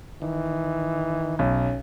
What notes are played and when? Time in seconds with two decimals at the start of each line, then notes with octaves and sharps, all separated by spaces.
0.22 D#3 E3
1.39 B1 C#4